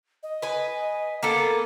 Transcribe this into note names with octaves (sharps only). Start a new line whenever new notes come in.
D#5
B4 G#5
A#3 B3 A4 D6